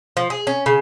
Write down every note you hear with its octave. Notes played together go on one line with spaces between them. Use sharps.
F3
G#4
C#4
C#3